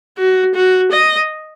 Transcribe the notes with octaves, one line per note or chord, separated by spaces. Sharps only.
F#4
F#4
D#5